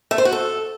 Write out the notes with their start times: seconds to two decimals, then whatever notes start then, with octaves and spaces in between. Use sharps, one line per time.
0.11 A3
0.18 C5
0.25 F#4
0.33 A4